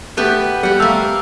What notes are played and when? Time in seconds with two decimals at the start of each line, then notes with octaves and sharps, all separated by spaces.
0.17 A3 B3 G4 B4
0.63 G3 G4 F#5
0.80 A3 A#3 F5 E6